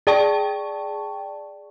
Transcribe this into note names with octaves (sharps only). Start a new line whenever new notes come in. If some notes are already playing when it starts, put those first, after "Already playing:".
G#4 D5 G5 A5 C#6